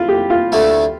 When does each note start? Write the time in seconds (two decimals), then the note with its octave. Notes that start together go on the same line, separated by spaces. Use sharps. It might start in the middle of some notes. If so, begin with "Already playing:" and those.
Already playing: E4 F4
0.09 G4
0.30 F4
0.52 D2 D3 A3